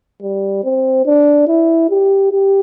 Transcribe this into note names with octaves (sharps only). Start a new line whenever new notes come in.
G3
C4
D4
E4
G4
G4